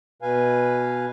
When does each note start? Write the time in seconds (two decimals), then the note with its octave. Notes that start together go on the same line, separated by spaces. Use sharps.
0.22 B2 B4 F5 G#5